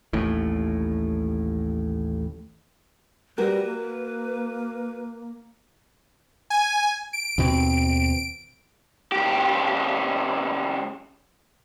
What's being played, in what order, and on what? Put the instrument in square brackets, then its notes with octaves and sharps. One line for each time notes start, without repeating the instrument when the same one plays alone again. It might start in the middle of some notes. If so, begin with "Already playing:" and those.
[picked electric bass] A1 D#2 A2
[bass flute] G3 [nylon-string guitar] F#4 A#4 [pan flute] B4
[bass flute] A#3
[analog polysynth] G#5
D7
[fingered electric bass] D#2 B2 C4
[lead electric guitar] C#2 G4